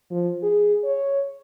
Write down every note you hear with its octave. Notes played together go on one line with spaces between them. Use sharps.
F3
G#4
C#5